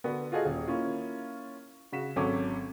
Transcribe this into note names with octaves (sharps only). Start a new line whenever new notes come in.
D3 B3 F#4
F4 F#4 G#4 A4 D#5
D#1
A#3 C#4 E4 F4
C#3 F#4 B6 E7
G#1 F#3 C#4 A4 D6